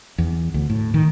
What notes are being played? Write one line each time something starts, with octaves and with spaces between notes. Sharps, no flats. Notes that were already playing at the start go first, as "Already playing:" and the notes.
E2
D2
A2
D#3